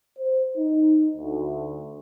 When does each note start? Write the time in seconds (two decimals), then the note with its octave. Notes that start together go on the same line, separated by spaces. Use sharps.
0.18 C5
0.57 D#4
1.17 D2